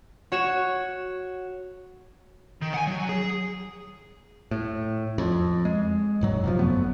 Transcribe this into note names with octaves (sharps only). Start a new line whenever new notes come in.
F#4 C#5 E7
D#3
F#5 G#5
F#3
G#4
A2
F2
G#3
F1 G#2 F#3
F#2 C3 F3
G1 A3 B3